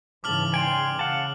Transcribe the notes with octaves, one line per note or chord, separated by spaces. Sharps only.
G#2 C#3 E3 A5 D6 F6 F#7
D5 G5 G#5 C6 D7
C#3 F5 F#5 A5